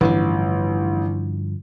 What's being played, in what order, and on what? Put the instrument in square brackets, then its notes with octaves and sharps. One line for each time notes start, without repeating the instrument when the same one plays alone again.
[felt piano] A1 [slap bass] G2 D3 F3